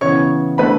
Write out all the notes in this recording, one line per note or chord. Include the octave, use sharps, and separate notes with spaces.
C#3 E3 B3 C#5 C#6
D3 A3 B4 B5